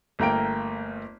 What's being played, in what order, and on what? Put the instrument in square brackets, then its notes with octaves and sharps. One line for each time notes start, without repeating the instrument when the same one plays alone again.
[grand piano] G1 A3 A#3 A#4 G5 D7